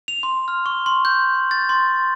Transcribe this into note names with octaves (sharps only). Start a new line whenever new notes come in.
F7
C6
F6
C#6
C6
G6
A6
C6